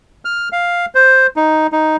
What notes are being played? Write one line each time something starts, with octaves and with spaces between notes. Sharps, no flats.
F6
F5
C5
D#4
D#4